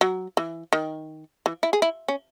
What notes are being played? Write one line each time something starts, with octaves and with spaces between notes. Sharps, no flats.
F#3
E3
D#3
E3
E4
G#4
E4
C#4